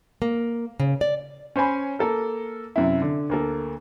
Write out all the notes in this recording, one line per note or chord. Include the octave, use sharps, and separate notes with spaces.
A#3
C#3
D5
C#4 C5 C#5 G#5 B5
A#3 A4 A#4
F#2 C3 E4
D3
D2 A#3 A4